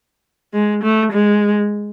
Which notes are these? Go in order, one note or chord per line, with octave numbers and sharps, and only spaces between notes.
G#3
A3
G#3